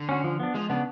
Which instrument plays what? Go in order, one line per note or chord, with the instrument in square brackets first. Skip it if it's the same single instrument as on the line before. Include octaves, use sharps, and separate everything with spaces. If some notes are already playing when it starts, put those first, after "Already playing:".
Already playing: [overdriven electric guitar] D3
[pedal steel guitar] C#4 F#4
F3
B3 D4
[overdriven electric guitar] F3 [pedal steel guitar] G#3
[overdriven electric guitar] C#3 [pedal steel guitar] B3 D4